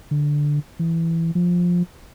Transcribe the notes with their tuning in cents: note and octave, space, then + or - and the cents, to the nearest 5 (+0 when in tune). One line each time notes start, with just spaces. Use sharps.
D3 +0
E3 +5
F3 +10